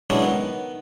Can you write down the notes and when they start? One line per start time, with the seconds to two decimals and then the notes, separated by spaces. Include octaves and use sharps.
0.10 E3 F#3 G#3 C#4 D4 E4
0.22 D#3 B3